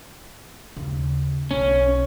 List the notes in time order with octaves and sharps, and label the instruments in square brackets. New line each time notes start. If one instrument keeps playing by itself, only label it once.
[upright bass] D#2 C#3
[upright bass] B1 [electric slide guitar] C#4